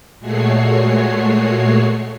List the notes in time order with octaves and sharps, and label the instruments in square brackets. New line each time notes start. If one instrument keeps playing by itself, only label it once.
[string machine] A#2 G#3 A3 F#4 C#5 C7